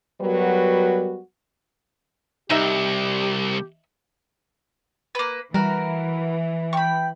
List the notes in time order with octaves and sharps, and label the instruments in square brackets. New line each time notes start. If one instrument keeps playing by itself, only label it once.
[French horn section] F#3 G3 B3 F#4 A#4 B4
[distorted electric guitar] C2 [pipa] D#4 E5 [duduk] G4
[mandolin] A#3 B4
[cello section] E3 [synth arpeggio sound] G3 [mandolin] F#4 A#4
[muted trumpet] G5 [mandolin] B5 C#6